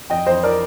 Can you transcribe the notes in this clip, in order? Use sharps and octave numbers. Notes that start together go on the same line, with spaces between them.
F2 D#5 G5
F2 C5 D#5
A#4 D5